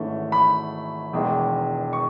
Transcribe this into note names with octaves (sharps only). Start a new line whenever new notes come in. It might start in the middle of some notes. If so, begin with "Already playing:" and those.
Already playing: G#1 G#2 E3 A3 C#4
B5
E1 E2 D#3 G#3
C#6